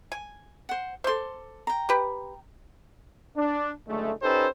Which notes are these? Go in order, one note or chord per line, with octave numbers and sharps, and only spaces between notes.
G#5
C5 F#5
A4 C5 C6 D6
G5 A#5
G4 B4
D4
F#1 D3 G#3 A3
C#4 D#4 G4 A4 B4 C5